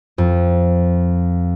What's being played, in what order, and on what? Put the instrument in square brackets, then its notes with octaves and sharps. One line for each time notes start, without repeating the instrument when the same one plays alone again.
[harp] F2